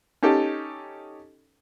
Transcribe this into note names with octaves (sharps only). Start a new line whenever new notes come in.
C#4 D#4 G4 A4